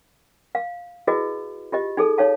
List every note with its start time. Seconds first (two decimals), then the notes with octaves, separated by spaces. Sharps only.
0.55 F5
1.07 E4 F#4 G#4 B4 D#5
1.72 F4 G4 D#5
1.97 D#4 G#4 A4
2.18 D#4 C#5 F5 A5